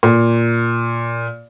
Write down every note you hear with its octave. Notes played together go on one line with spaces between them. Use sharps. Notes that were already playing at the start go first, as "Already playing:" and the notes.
A#2